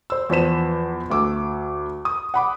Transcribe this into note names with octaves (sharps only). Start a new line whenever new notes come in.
C5 E6
E2 F3 C5 B6 E7
D2 D6 E6
D#6
F#5 B5 D6